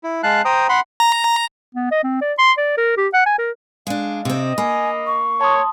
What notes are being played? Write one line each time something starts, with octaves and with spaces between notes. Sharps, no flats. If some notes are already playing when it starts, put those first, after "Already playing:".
E4
G#3 F5 A5 F#6
C5 G5 A#5 D#6
F#5 B5 C6
A#5
B3
D#5
C4
D5
C6
D5
A#4
G4
F#5
G#5
A#4
G#3 D4 F5
C3 C4 D#5
A#3 G#5 B5
C#6
C#5 A5 C6 D#6